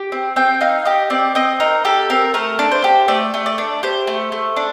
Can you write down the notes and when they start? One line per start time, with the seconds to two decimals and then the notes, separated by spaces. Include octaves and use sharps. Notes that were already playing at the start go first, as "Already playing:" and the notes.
Already playing: G4
0.12 C4
0.36 C4 G5
0.61 D#4 F5
0.85 G4 D#5
1.10 C4 D5
1.35 C4 D#5
1.60 D#4 A#4
1.85 G4 A4
2.10 C4 A#4
2.34 A3 A#4
2.59 D4
2.72 C5
2.84 G4
3.08 A3 D5
3.34 A3
3.46 D5
3.58 D4
3.83 G4 C5
4.07 A3
4.32 A3
4.56 D4